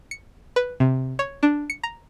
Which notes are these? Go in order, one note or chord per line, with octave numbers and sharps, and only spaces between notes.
C#7
B4
C3
C#5
D4
C#7
A#5